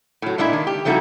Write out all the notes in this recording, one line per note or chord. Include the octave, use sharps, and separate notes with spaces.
A2 F#3
A#2 G#3 D4 E4 E5
D#3
G4
F3 G3 A3 D#4 E4 F#4